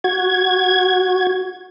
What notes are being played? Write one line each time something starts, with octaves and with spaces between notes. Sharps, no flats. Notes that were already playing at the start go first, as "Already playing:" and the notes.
F#4 G#6